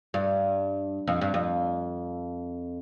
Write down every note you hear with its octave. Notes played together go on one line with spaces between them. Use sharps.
G2
F2
G2
F2